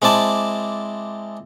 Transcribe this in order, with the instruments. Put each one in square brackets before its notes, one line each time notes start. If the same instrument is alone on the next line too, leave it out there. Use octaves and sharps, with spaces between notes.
[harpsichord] G#3 C4 E4 D5 A5